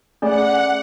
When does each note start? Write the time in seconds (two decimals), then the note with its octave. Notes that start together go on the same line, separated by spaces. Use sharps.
0.22 A3 C#4 G#4 D5 F#5